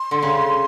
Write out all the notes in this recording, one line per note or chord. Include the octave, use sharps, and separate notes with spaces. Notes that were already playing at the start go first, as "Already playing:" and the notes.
Already playing: C6
D3
C#3